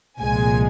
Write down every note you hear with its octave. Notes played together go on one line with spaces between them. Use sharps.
C2 A#2 F3 G#3 G#5